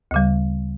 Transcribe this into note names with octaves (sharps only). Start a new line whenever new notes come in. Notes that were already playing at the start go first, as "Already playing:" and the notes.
D2 C#3 G3